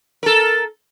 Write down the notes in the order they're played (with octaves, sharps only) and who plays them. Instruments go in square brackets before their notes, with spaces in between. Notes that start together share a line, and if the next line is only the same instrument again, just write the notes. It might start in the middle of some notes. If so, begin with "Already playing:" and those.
[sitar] A4 A#4